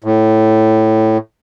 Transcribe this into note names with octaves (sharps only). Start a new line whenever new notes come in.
A2